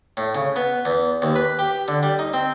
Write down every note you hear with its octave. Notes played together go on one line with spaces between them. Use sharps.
A2
C#3
B3
E2
D#2
B4
G4
D3
G3
D#4
C4